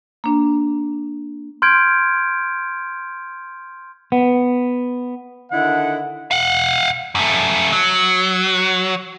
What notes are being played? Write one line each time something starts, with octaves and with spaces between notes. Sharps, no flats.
A#3 D4
C6 F6 G6 G#6 D7
B3
D3 D#3 E4 A4 D#5 F#5
F5 F#5
F#2 A3
F#3